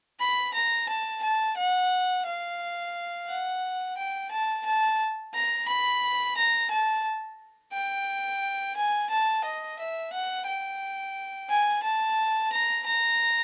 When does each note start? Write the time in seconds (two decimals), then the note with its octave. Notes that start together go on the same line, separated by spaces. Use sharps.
0.21 B5
0.54 A#5
0.89 A5
1.23 A5
1.57 F#5
2.26 F5
3.28 F#5
3.97 G5
4.31 A5
4.65 A5
5.34 A#5
5.68 B5
6.36 A#5
6.70 A5
7.73 G5
8.76 G#5
9.10 A5
9.44 D#5
9.78 E5
10.13 F#5
10.47 G5
11.49 G#5
11.83 A5
12.52 A#5
12.86 A#5